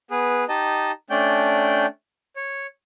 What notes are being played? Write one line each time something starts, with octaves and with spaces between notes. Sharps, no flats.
B3 G#4 B4
D#4 G4 D#5 A5
A3 C#4 D4 D5 G5 G6
C#5